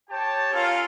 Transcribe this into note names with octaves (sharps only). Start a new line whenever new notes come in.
G4 C#5 G5 A5
C#4 F4 A4 A#4 F5